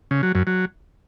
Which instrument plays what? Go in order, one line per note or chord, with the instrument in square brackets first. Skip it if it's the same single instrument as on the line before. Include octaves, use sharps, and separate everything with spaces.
[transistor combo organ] C#3
F#3
F#2
F#3